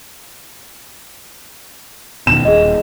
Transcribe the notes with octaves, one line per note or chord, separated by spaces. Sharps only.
B2 D#3 E7
D#1 G#4 D#5